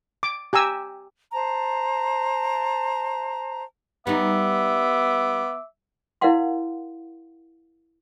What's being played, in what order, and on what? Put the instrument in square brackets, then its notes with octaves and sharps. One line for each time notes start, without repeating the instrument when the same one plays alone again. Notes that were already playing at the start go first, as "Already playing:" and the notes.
[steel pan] D6
G4 G#5 A#5 E6
[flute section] C5 A5 A#5
[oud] G3 D#4 [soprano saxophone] B3 [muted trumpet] E5 [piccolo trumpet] D6
[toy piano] E4 A#4 D5 F5 F#5 C6